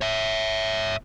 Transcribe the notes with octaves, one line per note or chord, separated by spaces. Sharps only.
C#5 E5